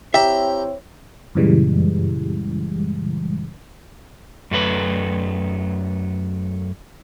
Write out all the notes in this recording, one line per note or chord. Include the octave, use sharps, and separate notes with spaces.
C4 E4 G4 C#5 E5 A#5
F#2 A#2 C#3 E3 G3 G#3
F#2 A3 B4